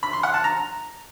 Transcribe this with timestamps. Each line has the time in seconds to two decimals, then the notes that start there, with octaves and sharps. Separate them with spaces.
0.03 B5
0.13 C6
0.23 F#5
0.34 A5
0.44 A#5